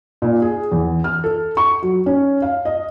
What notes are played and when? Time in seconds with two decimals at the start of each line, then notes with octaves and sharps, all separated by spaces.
0.22 A#2
0.42 G#4
0.72 E2
1.04 F6
1.24 A4
1.57 C#6
1.82 F#3
2.06 C#4
2.42 F5
2.65 D#5